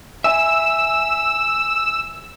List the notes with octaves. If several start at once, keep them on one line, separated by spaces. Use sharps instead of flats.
E5 G#5 E6